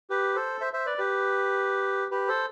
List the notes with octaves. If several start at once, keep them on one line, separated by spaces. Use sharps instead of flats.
G4 B4
A4 C5
C5 E5
C5 E5
B4 D5
G4 B4
G4 B4
A4 C5